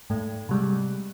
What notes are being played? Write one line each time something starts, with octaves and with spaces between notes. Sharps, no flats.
G#2 A3
C3 G3 G#3